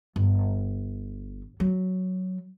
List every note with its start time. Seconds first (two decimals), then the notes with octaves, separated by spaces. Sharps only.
0.16 G1
1.60 F#3